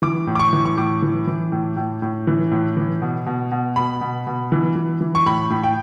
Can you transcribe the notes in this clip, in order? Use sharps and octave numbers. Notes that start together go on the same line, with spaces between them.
E3 D6
A2
D6
C#6
E3
C#6
A2 D6
E3
E3
A2
A2
A2
E3
A2
E3
B2
B2
B2
B2 B5
B2
B2
E3
E3
E3
C#6
A2 B5
A2
G5